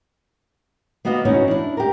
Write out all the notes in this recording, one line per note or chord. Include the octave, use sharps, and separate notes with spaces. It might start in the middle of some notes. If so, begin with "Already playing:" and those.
A#3 B3 F#4 D#5 F5
E3 B3 C#4 D#4 F#4
D4 E4
G4 A#4